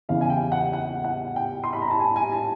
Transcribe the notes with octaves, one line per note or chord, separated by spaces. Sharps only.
E2 C#3 E3 F5
G#5
G5
F#5
F#5
F#5
G5
C6
B5
A#5
A5
G#5
G#5
A5